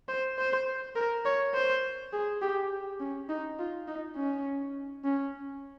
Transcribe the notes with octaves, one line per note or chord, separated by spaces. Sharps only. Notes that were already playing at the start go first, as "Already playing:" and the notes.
C5
C5
A#4
C#5
C5
G#4
G4
C#4
D#4
F4
D#4
C#4
C#4